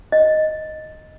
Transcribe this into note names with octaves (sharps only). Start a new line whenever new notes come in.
D#5